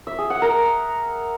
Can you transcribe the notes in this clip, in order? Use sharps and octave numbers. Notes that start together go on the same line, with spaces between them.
E5
G#4
F#5
A#4